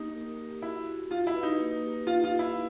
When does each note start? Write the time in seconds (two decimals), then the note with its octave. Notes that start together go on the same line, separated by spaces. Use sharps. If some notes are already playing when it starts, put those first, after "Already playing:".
Already playing: A#3 D#4 G4
0.15 A#4
0.38 G4
0.62 E4 F#4
0.86 F#4
1.11 F4 F#4
1.27 E4
1.35 B4
1.43 D#4
1.59 A#3
1.83 G4
2.07 D#4 F4
2.24 F4
2.31 G4
2.39 E4